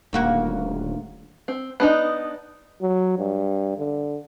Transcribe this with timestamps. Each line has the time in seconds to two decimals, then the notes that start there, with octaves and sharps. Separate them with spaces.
0.13 D#1 D2 A#3 F#4
1.48 C4
1.80 B3 D4 D#4
2.82 F#3
3.19 G2
3.78 D3